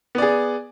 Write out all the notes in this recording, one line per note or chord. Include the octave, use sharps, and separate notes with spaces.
B3 G#4 D5